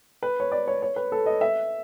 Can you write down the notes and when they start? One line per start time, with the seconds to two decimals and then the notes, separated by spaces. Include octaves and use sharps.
0.23 B4
0.40 C#5
0.52 D5
0.68 C#5
0.82 C#5
0.96 B4
1.12 A4
1.26 D#5
1.41 E5